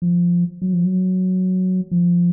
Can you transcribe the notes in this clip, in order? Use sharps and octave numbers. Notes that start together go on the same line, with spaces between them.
F3
F#3
F3
F#3
F3